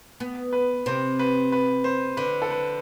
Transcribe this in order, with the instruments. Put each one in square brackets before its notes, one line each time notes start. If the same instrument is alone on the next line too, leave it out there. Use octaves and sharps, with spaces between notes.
[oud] B3
[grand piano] B4
[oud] C3 [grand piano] C5
[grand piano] B4
B4
C5
[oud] D3 [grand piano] B4
[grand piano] A4
B4